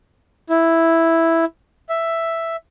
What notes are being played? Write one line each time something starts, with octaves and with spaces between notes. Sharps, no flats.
E4
E5